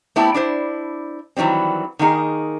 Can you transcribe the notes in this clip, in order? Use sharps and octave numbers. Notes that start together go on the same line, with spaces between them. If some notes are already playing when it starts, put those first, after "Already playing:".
A3 B3 C4 E4 G4 A4
D4 E4 C5
D#3 E3 F#3 G3 C4
D#3 A#3 D#4 G#4